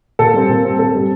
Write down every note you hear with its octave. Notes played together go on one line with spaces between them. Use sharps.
A#2 A4
G3 C4
A#2
G3 C4
A#2 A4
G3 C4